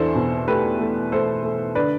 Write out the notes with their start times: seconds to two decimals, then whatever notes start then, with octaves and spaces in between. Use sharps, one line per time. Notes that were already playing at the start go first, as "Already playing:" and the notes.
Already playing: E2 D4 E4 A4 C5
0.15 B2
0.48 A3 G4 B4
0.79 A3
1.12 A3 A4 C5
1.43 A3
1.75 D3 B4 D5